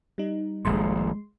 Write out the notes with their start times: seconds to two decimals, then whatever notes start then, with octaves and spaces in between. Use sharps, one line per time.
0.18 G3 D#4
0.65 D#1 A#1 A2 G#3 C6